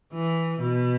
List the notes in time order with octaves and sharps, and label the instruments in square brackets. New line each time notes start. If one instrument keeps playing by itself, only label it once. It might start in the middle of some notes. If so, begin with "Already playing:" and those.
[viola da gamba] E3
B2